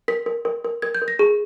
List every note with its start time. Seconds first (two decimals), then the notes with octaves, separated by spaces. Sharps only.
0.08 A#4 B6
0.26 A#4
0.45 A#4
0.65 A#4
0.82 A#4 G#6
0.95 G6
1.02 A#4
1.08 A#6
1.19 G#4